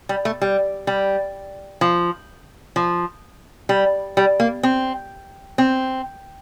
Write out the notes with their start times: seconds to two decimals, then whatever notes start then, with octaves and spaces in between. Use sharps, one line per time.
0.09 G3
0.25 A3
0.42 G3
0.87 G3
1.81 F3
2.76 F3
3.69 G3
4.17 G3
4.40 A#3
4.63 C4
5.58 C4